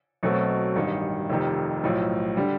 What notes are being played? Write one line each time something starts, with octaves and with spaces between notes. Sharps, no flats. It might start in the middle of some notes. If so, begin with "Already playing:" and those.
B1 B2 F#3 A3 C4
A1 G2 D#3
F1 F2 C3 D#3
B1 A2 F3
D3 G3